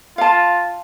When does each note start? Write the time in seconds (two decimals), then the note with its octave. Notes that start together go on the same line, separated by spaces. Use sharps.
0.18 F4 F5 A5